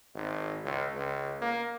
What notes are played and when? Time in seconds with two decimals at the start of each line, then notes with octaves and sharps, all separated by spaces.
0.15 G#1
0.64 C#2
0.96 C#2
1.42 A#3